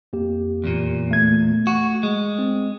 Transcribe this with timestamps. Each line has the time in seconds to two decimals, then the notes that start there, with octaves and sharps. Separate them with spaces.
0.13 F2 A#3 G4
0.64 E2 A#2
1.11 A3 G#6
1.67 F#4
2.03 G#3
2.39 C4